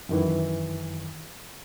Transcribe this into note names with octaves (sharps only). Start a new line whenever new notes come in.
F#2 D#3 E3